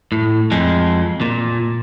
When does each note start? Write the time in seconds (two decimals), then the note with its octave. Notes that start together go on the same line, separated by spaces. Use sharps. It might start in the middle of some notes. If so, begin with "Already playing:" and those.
0.12 A2
0.52 F2 G#3
1.21 A#2